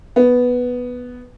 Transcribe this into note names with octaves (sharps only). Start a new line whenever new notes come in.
B3